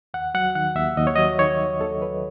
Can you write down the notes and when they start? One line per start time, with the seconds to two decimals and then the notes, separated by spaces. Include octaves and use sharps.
0.14 D#2 F#5
0.34 F#3 F#5
0.55 D#3 F#5
0.76 D#2 E5
0.97 D#2 D#5
1.07 C#5
1.16 F#3 D#5
1.39 D#3 C#5
1.60 D#2
1.81 D#2 A4
2.02 F#3 B4